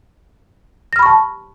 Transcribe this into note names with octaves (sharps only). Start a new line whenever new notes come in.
A5 B5 C#6 F6 A#6